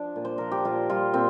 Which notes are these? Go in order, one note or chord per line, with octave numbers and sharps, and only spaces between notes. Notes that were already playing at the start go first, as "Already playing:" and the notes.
Already playing: F3 D4
A#2
C5
F3 A#4
G4
A#2 F4
G3 F4
A#2 C4